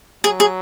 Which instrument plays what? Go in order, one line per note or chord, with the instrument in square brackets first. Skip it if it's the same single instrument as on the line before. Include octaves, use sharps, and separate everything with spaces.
[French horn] F#3 [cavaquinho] G#4
[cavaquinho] G#4